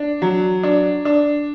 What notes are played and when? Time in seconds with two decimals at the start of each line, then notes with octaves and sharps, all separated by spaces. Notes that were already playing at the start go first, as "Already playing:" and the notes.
Already playing: D4
0.22 F#3
0.63 D4
1.05 D4